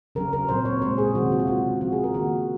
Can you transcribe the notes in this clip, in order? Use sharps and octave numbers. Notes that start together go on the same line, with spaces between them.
C#3 F#3 C#4 A#4
A#4
A#2 F#3 C4 C5
C#5
A#2 G#3 C#4 C5
G#4
C3 D#3 F#3 C4 F#4
F#4
F4
C#3 G#3 C#4 F#4
F3 C4 F#4
G#4
A#4
D#3 A#3 C#4 F#4